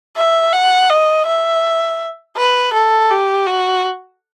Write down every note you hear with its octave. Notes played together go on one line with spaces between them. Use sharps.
E5
F#5
D#5
E5
B4
A4
G4
F#4